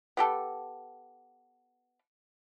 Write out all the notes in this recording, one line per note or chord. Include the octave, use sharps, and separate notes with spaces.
B3 G4 A4